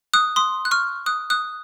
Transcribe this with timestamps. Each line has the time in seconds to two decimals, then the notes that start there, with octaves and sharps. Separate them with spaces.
0.14 D#6 F#6
0.36 C6 D#6
0.65 F#6
0.71 C#6 F6
1.06 D#6 F#6
1.30 D#6 F#6